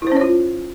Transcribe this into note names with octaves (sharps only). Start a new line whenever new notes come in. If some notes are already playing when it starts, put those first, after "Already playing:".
C#4 E4 F4 C5 C#5